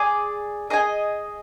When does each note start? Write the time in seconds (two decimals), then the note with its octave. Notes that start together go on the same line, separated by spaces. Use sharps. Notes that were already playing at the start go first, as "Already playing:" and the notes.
Already playing: G#4 D5 G#5
0.70 G#4 D#5 G#5